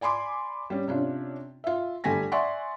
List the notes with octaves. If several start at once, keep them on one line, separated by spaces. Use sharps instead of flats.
D5 G#5 B5 C6 D6
G3 C#4
C3 C#4 D4 F4
F4 E5
G1 G3 A3 G#5 A#6 B6
D5 E5 F#5 G#5 C6 C#6